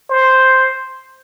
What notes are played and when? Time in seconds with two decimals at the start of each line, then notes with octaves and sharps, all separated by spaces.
0.10 C5